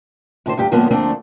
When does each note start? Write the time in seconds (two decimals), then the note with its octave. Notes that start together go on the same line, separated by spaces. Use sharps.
0.46 A2 D3 B4 C5
0.57 D2 G2 G4
0.71 A2 D3 F3 G#3 A#3 B3
0.90 D2 F3 A3 A#3 C4 D4